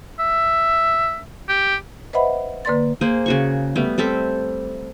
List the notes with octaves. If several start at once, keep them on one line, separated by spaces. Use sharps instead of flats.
E5
G4
B4 C5 D#5 E5 F#5 B5
D3 A#3 B4 D5 C6 A6
A#3 G#4 C5
C#3 F#4 C#6
G3 A3 B3
G3 C4 A4 E5